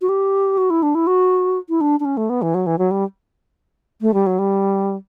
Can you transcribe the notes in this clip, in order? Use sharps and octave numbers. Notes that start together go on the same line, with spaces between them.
F#4
G4
F#4
E4
D4
E4
F#4
E4
D4
D4
C#4
A3
B3
E3
F#3
E3
F#3
G3
A3
G3
F#3
G3